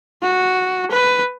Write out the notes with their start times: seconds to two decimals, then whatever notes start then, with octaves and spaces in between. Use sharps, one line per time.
0.23 F#4
0.91 B4